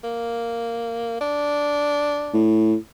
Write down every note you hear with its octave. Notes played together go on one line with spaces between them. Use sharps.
A#3
D4
A2